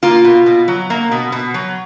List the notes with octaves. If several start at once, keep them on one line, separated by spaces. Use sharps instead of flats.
A#3 F4
B2
B2
F#3
A#3
B2
B2
F#3